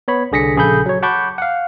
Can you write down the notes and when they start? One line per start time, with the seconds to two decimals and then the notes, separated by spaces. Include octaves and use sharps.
0.08 B3 C#5 B5
0.32 C2 D3 G#4 A#6 B6 C#7
0.56 A#1 C#3 G#4 A4 B5 G6
0.86 F#3 C#5
1.03 F#5 A5 B5 C#6 D6 G6
1.38 F5 F#5